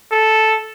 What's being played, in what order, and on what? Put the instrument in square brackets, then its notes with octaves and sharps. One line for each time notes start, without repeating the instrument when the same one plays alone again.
[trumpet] A4